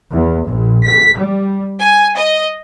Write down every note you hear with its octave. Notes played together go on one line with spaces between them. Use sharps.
E2
A#1
B6
G3
G#5
D#5